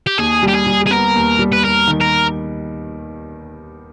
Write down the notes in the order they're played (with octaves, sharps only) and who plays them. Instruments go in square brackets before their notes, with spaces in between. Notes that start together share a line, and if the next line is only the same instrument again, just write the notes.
[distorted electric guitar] G4
[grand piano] D#2 [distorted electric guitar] G#4
[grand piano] G3
[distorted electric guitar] G4
G#4
[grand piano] G3
[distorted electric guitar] G#4
[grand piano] B3 [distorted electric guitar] A#4
[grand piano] D#2
G3
[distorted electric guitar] B4
[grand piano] D#2 [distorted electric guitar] A#4
[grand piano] D#3
[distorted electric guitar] A#4